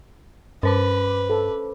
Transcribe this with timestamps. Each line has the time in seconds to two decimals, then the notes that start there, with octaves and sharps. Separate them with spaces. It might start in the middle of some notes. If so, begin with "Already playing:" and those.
0.63 G2 C#4 B4 C5 D6
1.30 A4